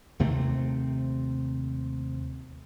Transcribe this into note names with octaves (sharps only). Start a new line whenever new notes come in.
D#2 C3 A3 C4